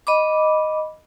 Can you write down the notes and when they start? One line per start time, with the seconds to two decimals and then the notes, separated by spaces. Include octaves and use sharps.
0.07 D#5 B5 D6